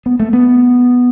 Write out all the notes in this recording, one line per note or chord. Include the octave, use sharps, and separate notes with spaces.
B3
A3
B3